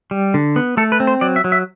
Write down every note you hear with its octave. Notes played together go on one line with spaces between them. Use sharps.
G3
D3
B3
A3 A4
B4
C4
C5
F#3 D5
E5
F#3
E5